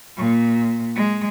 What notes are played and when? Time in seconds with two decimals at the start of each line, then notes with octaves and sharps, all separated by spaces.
0.17 A#2
0.96 G#3